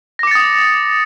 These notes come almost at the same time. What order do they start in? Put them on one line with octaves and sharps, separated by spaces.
A#6 D6 C#7 A6 D#6